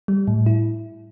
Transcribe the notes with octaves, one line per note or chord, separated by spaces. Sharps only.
G3
A2
E4